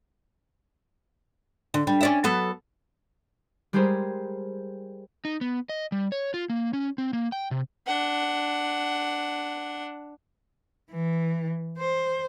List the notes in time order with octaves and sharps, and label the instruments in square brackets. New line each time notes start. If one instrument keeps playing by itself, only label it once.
[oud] D3
G3
C#4 D5 E5
F#3 B3 A4
[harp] G3 G#3 G4 G#4 A#4 C5
[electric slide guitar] D#4
B3
D#5
G3
C#5
F4
A#3
C#4
C4
A#3
G5
C3
[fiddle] D4 F#5
[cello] E3
C5